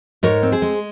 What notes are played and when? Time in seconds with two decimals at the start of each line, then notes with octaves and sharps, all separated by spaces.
0.23 G#2 A#4 C#5
0.43 C4
0.52 G#4 C5
0.62 G#3